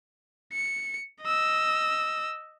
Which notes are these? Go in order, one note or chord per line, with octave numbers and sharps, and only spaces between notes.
C#7
D#5 E6